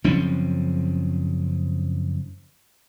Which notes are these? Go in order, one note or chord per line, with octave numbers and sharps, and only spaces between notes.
F#1 F3 C4 C#4